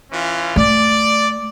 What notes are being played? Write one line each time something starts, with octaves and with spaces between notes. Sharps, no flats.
E3 C#4 F4
A3 D5